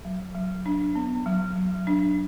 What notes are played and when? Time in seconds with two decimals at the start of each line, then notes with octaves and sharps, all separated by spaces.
0.05 F#3
0.35 F#3
0.66 D4
0.95 B3
1.26 F#3
1.56 F#3
1.87 D4